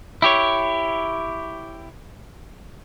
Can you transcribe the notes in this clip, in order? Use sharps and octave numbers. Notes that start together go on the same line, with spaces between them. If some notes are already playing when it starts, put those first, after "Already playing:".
E4 G4 C#5